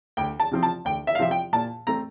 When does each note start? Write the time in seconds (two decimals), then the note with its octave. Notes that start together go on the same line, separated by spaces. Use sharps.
0.17 D2 G5
0.40 A5
0.51 C3 F3 C4
0.63 A5
0.85 D2 G5
1.07 E5
1.15 F5
1.19 C3 F3 C4 E5
1.31 G5
1.53 A#2 A5
1.87 A3 C4 A#5